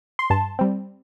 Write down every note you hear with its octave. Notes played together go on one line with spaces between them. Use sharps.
C6
G2 A5
G3 C4